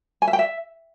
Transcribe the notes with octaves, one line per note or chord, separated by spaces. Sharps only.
G#5
E5
G5
E5